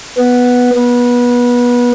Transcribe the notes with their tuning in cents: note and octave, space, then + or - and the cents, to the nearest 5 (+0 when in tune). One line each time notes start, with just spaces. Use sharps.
B3 -5
B3 -25